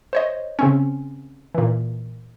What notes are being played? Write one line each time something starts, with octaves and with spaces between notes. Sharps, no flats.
C5 C#5 D#5
C#3 C4 C#4
A#2 E3